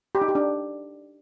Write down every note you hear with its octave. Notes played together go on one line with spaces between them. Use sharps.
G4
D#4
G4
D4